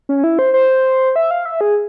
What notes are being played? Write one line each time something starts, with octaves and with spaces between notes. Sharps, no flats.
C#4
E4
C5
C5
E5
F5
E5
G#4